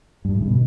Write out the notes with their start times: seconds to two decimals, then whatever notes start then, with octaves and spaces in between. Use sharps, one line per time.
0.25 G2
0.35 A2
0.41 C#3
0.47 B2